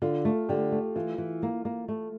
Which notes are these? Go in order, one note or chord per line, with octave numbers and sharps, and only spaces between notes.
D3 F4
A3
D3 G4
A3
E3 F4
E3
A#3
A#3
A3